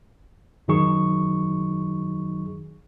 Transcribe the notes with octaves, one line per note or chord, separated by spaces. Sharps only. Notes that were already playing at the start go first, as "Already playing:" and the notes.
F#2 D#3 F#3 D#4 G#4 C#6